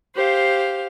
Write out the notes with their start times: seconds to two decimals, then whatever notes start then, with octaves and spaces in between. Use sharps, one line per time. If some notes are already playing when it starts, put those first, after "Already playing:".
0.14 G4 C5 F5